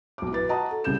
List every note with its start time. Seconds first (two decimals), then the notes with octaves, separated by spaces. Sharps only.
0.18 B1 D6
0.31 E4 B4 A6
0.49 F#4 D#5 F#5 A5 A#5 D#6
0.71 A4
0.84 C2 C#3 E4 G6 E7